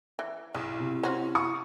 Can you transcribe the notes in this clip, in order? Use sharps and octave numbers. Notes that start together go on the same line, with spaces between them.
E3
B1 C#3 E4
C3
C#4 F4 F#4 C5
C#6 D#6